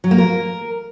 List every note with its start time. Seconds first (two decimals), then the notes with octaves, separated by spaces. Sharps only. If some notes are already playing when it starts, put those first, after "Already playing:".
0.04 F#3
0.11 A#3
0.18 A#4